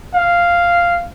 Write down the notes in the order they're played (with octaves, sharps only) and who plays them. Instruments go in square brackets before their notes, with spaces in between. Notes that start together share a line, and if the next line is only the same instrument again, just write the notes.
[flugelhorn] F5